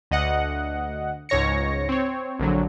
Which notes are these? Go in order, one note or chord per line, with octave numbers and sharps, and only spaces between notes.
D2 D#5 F#5
C#2 G#2 C#5 A#6 C#7
C4 C#5
A#1 D3 F#3